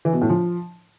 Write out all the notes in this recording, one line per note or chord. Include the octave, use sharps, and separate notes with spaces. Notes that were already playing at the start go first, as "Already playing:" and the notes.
E3
B2
A2
F3